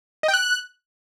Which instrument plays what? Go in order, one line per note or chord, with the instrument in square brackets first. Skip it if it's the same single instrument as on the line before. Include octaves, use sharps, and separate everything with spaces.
[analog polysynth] D#5
G5
F#6